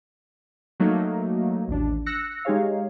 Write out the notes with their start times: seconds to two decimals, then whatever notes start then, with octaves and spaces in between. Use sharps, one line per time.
0.80 F#3 A3 A#3 D#4
1.68 A1 D#2 D4
2.06 E6 F#6 A#6 C#7
2.45 G#3 D#4 G4 G#4 C#5 F5